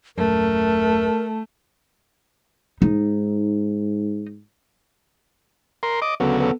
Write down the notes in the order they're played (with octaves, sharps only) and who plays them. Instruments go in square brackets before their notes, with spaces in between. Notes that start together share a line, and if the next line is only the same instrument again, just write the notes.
[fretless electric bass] D#1 F#2 [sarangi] A3 [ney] A#4
[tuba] G#2 [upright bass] D#4
[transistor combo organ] A#4 C6
D#5 D6
[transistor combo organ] D2 C#3 F#3 [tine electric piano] B3 A4
[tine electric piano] B3 A4